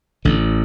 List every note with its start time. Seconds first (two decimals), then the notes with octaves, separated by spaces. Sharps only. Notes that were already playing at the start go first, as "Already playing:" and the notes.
0.25 A1 A2 D3